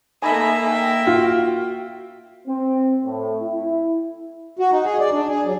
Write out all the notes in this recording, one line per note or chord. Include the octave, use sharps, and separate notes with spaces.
A3 A#3 D#4 E5 G#5 B5
G5
F4 F#4
C4
A2
E4
F#4
D#4
G#4
D5
D4
G#4
F#3